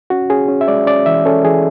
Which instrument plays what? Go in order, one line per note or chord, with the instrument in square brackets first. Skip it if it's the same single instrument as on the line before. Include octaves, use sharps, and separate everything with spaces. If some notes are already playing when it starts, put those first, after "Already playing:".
[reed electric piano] C#4 F#4
C#4 G#4
C#4
E5
G#3 D5
C#4 D5
E3 E5
C#4 A4
E3 G#4